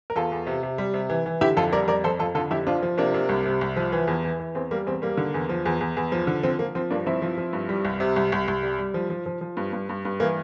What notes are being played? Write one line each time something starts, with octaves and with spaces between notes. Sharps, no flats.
A#4
E2 F4 A4
E2
C3
C3
G3
C3
E3
E3
D3 E4 G4
F2 F4 A4
G3 A#4 D5
F2 A#4 D5
F2 A4 C5
F2 F4 A4
D3 F4 A4
F2 E4 G4
F3 D4 F4
F3
C3 A#3 D4
C3
C2
C3
C2
F3
E3
E2
E3
E3
E2 C4
G3 A#3
E2 C4
G3 A#3
D3
E2
F3
E2
E2
E2
F3
D3
F3 C4
F3 A#3
F3 C4
G2 A#3 D4
F3 C4 E4
F3
F3
G2
G3
C2
C3
C2
C2
C2
G3
G3
F3
F3
F3
F3
G2
G2
G2
G2
E3 A#3